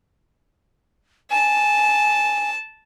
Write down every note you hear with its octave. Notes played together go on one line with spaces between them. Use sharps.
G#5 A5